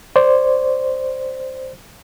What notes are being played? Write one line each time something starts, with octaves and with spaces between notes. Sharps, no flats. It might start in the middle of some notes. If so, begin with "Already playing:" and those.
C5 D5